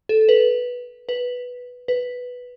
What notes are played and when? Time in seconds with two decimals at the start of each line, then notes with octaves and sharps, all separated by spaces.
0.09 A4
0.29 B4
1.09 B4
1.88 B4